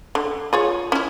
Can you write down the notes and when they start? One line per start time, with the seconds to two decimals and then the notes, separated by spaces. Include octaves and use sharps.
0.15 D3
0.53 F4 G#4 C#5
0.92 C#4 E4